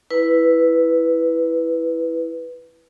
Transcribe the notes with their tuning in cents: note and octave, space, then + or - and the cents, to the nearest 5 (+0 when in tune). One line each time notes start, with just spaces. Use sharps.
E4 +0 B4 +0